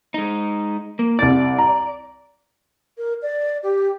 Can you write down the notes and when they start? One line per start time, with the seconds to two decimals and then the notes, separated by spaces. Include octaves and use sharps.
0.14 G#3 D#4
0.99 A#3
1.19 C2 D5 A6
1.58 A#5
2.98 A#4
3.22 D5
3.63 G4